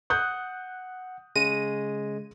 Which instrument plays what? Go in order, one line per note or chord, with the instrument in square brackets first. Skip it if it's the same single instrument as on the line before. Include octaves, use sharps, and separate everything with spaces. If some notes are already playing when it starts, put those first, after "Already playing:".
[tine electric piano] F#5 [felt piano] D#6 F#6 G6
[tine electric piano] C#3 G#3 A#6 [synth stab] D#7